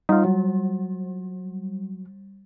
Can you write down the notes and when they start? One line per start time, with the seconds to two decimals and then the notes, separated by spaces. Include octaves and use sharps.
0.09 G3 D#4 F4
0.25 F#3